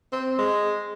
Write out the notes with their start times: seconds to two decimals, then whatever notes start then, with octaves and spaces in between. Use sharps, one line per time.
0.13 C4
0.39 G#3